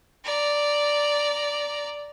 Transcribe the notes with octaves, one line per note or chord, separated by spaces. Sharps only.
D5 A#5